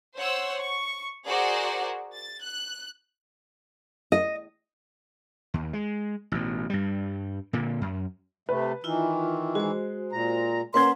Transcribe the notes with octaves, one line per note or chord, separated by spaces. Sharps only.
C5 C#5 F#5 E6
C#6
F#4 G#4 A#4 C5 D5 F#5
A6
F#6
D#5
D#2
G#3
A1 B2
G2 G3
A#2 D3 A#3
F#2
C3 A3 B4
D#3 E3 E4 F4 E5
G#3 F#4 C5
A#2 A#5
A#3 C#4 B4 F#5 C6 G#6